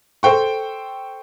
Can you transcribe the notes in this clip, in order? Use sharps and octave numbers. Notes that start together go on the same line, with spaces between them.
A4 C5 G5 C#6